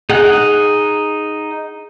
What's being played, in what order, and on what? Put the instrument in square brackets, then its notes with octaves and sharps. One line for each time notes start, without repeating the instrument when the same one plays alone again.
[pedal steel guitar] D#4 F#5 F#6 [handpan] G#4